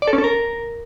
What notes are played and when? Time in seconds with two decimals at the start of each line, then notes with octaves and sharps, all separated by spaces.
0.02 D5
0.08 A4
0.13 C#4
0.18 A4
0.24 A#4